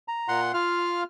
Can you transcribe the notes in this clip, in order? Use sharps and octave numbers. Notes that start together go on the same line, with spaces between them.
A#5
A#2 F#5 C6
F4 F5 F6